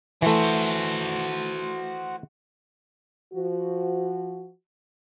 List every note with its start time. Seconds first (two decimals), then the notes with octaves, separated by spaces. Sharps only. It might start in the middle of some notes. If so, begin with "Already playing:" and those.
0.22 E3 A3 F#4 C5
3.34 F3 F#4